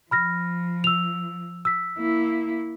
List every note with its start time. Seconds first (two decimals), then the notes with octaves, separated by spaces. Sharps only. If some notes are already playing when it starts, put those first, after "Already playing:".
0.11 F3 B5 F6 A#6
0.84 E6 F7
1.65 E6 B6
1.98 A#3 E4